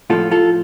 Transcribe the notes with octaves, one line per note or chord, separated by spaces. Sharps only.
A2 F3 F4 A4
F4 A4